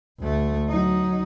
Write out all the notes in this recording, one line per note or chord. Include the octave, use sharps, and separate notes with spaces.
D2 A3
F#3 D#4